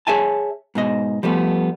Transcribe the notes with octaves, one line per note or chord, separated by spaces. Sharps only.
G#4 C#5 E5 G#5 A5
G#2 B2 D#5
F3 G3 A3 B3